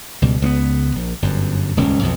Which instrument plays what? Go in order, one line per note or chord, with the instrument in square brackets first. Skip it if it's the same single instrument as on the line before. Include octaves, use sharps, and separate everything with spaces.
[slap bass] C#2 B2 G3
C#2 A#3 B3
A#1
G1 F#2
D#1 C#2 G#2 C#4
B1 F2